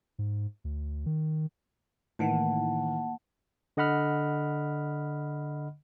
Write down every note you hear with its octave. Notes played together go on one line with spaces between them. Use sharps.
G#2
D2
D#3
A2 D#3 E3 A#3 F#5 A5
D3 D#5 F#5 B5 F6